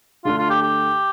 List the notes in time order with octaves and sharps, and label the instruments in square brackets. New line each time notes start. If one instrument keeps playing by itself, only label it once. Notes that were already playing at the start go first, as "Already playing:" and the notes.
[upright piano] D3 A3 D4 [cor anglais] F4
[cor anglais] F4
G4
G4